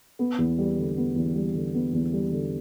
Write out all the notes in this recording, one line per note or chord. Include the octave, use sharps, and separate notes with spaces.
B3
E2
G3
D3
B3
E2
G3
D3
B3
E2
G3
D3